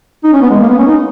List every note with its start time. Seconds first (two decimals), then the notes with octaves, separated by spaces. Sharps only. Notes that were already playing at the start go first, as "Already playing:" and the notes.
0.24 D#4
0.33 C#4
0.42 B3
0.51 G#3
0.61 A#3
0.70 B3
0.79 C#4
0.87 D#4